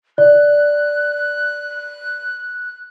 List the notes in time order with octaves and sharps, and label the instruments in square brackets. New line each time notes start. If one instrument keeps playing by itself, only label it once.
[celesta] D5 [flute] F#6